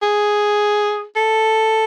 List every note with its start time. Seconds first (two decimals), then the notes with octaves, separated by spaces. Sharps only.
0.03 G#4
1.16 A4